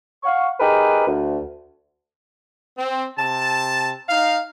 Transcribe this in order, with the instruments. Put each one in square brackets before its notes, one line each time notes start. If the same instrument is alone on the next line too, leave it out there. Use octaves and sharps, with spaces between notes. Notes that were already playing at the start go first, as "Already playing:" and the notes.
[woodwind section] F5 F#5 C#6
D#4 G4 G#4 A#4 B4
D2
[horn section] C4
C3 A5
D#4 F5